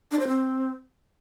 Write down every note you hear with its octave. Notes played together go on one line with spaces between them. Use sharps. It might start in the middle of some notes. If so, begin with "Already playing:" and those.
D4
C5
C4